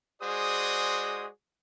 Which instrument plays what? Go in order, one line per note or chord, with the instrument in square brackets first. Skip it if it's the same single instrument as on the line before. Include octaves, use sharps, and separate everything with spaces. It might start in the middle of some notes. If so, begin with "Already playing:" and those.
[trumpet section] G#3 F#4 G#4 C5 D5 D#6